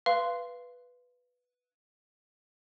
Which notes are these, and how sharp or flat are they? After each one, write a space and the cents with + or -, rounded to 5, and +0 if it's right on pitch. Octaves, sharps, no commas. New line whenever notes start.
B4 +0 F5 -20 C6 -10